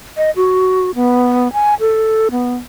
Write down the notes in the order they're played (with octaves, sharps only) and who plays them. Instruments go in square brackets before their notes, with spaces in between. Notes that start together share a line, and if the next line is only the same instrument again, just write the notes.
[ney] D#5
F#4
B3
G#5
A4
B3